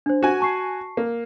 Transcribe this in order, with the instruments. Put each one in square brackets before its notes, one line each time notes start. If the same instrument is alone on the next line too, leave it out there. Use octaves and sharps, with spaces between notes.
[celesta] D4 C5
[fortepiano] F#4 G#5
[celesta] A5 C#6 C7
[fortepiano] A#3